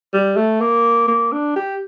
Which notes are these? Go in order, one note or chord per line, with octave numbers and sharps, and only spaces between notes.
G3
A3
A#3
A#3
D4
G4